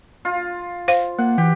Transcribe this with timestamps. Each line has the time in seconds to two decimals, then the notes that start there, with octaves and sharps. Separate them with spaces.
0.25 F4
0.88 C5 F5
1.18 A#3 F#5
1.38 E3 G4